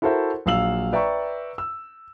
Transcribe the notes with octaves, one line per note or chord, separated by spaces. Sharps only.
E4 F#4 A4 A#4 C5 E5
A#1 F#3 F5 E6 F#7
B4 D5 E5 G5 A#5 C#6
E6